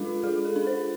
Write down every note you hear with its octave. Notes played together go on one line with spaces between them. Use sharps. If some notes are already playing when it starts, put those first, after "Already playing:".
Already playing: G#3 D4 F4 A4
G#3 G#4
A4
D4
C5